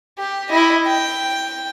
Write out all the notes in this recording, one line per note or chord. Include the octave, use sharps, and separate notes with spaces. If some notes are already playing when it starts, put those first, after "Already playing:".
G4
E4 D#5
G5